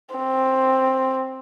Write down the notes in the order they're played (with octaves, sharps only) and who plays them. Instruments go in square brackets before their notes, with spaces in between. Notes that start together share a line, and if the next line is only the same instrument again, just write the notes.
[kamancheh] C4